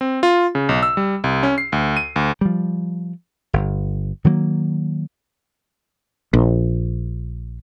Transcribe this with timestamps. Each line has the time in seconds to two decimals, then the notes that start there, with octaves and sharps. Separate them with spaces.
0.01 C4
0.23 F4
0.55 C#3
0.69 B1
0.83 E6
0.97 G3
1.24 C2
1.43 C#4
1.58 C7
1.72 D2
1.97 D#7
2.16 D2
2.41 F3 G3
3.53 G1
4.24 D#3 F#3 A3 A#3
6.33 A#1